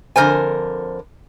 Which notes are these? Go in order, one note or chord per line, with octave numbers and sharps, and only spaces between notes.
F2 D3 E3 A#4 C5 G#5